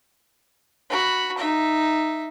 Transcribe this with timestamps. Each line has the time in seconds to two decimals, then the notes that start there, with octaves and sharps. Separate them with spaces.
0.90 F#4 B5
1.38 D#4 E5